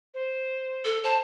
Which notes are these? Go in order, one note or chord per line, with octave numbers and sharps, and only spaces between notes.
C5
A4
C5 A5